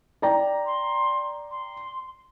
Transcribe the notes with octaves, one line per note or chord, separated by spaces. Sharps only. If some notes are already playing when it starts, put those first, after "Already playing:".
D5 G5 A#5
C6
C6